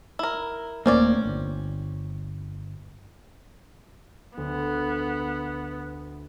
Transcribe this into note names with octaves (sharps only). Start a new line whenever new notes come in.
E4 A#4
D#1 A3 A#3 C4 C#4 D5
G1
D2 B3